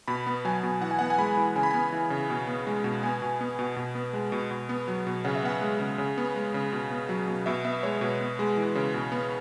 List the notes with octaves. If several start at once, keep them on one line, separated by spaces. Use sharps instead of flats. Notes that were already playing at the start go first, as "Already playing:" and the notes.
B2 B5
B3
F#3 G#5
B2
E3 F#5
G#5
B3 F#5
G#5
G#3 B5
E3
C#3 G#5
B5
B3 G#5
E3
C#3
B2
B3
G#3
B2
B3 G#5
B2
B3
B2
B2
B3
G#3
B2
B2
B3
F#3
B2
C#3 F#5
E5
B3 F#5
G#3
C#3
C#3
B3
G#3
C#3
B2
B3
F#3
B2
B2 E5
B3 E5
G#3 C#5
B2 B4
B3
G#3
E3
C#3
B2
B3